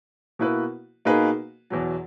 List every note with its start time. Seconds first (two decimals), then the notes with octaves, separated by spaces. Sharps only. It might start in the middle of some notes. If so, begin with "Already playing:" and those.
0.39 B2 A#3 E4 B4
1.05 B2 A#3 D#4 G#4 B4
1.70 E2 B2 F#3